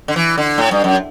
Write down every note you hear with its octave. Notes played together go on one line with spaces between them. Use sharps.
D3
E3
D3
A2
G2
F#2